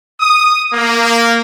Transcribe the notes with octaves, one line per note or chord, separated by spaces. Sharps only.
D#6
A#3